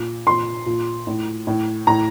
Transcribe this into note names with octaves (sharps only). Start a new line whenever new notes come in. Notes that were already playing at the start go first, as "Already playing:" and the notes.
Already playing: A#2
A#2 C6
A#2
A2
A2
A2 A#5